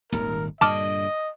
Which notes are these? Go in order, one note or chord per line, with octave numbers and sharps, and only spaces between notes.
D#1 G#1 D#2 A#4
G2 A#2 D3 D#5 A5 D6 F6